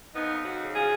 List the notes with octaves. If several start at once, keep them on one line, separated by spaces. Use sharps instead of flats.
F2 B3 D#4
D#4 F#4
C#3
F4 G#4